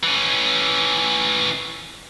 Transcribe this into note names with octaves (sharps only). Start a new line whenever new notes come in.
E3 C#4